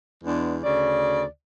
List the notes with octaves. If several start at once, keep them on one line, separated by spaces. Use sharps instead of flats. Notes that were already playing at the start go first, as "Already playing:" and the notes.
E2 G#3 B3 D4
D2 C#3 D5